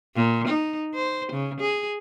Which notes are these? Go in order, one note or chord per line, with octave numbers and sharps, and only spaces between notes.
A#2
D#4
C5
C#3
G#4